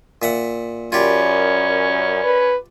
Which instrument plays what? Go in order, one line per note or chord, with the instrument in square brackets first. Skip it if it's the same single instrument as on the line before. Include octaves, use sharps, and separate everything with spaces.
[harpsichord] A#2 E5 F#5
[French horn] F#2 [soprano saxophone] C#4 [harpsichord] F4 G4 [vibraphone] A#4 D5 B5
[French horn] B4